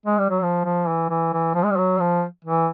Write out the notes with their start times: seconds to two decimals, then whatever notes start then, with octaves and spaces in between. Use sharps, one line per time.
0.06 G#3
0.18 G3
0.30 F#3
0.43 F3
0.65 F3
0.88 E3
1.10 E3
1.33 E3
1.54 F3
1.63 G#3
1.70 G3
1.77 F#3
2.00 F3
2.45 E3